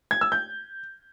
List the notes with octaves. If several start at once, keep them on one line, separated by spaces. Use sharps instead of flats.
G#6
E6
G6